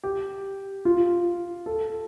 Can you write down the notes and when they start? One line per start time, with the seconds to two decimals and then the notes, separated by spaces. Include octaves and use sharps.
0.03 G4
0.85 F4
1.66 A4